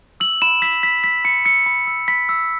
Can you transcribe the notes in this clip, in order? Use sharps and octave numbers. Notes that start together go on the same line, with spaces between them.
E6 F#7
B5 E7
E6 B6
B5 B6
E6 B6
B5 C#7
E6 C#7
B5
E6
B5 B6
E6